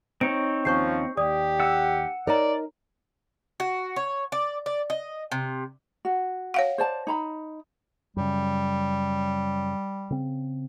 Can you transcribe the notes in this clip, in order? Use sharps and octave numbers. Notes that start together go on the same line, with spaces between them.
C4 D#4 C#5 D7
D#2 F3 C#4 C5 C#6 G6 C7
D#2 G4 D5 D#6
F#5 E6
D#4 A#4 C#5 D5 A#5
F#4
C#5
D5
D5
D#5
C3
F#4
C#5 F5 F#5
C5 D5 A5
D#4 A#5 B5
F#2 C#3 G3
C#3 C4